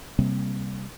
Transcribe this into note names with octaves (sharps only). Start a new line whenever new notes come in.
C3 G3 A#3 C4